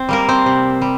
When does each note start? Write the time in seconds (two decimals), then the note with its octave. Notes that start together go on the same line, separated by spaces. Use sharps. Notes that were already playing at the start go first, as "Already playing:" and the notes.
Already playing: C4 C5
0.09 G3 A#3 A#4
0.29 C4 C5
0.46 C3
0.81 G3